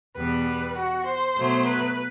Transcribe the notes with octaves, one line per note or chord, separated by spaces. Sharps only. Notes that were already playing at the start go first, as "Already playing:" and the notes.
E2 B2 G3 B4
F#4
C5
B2 F#3 A3
B4